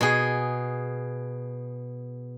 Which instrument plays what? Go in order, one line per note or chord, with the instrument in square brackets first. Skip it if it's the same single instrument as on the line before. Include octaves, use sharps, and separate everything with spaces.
[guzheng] B2 G#4